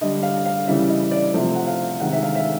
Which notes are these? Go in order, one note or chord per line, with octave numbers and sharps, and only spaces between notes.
D3 G3 D#5
F5
F5
C#3 E3 G3 E5
D#5
D5
C3 F3 A3
F#5
F5
C3 D#3 G#3 F#5
E5
F5
E5